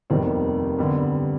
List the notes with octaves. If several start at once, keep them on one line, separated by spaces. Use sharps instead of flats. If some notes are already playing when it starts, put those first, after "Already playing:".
F1 D#2 D#3 G3 B3 C4
G2 D3 G3 B3